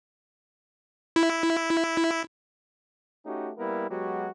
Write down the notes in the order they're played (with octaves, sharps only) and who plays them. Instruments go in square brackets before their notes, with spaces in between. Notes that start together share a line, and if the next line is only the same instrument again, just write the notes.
[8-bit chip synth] E4
[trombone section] A3 C#4 D#4 F#4 G4
G3 A#3 B3 E4 A#4
F#3 G#3 B3 F#4 G4